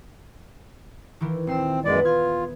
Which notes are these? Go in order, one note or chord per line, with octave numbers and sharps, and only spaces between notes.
D#3 E3
D#1 C4 C7 E7
F#2 G#3 B3 B4 D5
F4 F6 G#6